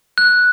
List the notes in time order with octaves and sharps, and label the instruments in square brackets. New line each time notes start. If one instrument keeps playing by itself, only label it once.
[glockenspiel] F#6